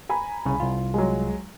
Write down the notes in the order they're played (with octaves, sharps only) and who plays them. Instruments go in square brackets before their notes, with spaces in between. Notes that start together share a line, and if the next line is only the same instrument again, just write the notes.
[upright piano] G#5 A#5 B5
[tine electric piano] C2 C#3
C2 F4
[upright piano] F#3 G#3